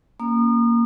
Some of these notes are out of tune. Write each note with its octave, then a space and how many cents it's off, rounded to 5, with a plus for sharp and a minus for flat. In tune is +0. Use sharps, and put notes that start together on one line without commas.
A#3 +0 C#4 +5 D#6 -35